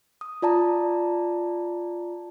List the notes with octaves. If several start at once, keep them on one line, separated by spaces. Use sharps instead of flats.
D#6
F4 D5 A5 A#5